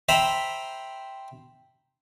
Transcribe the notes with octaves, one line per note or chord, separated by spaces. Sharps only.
C5 E5 G5 A#5 B5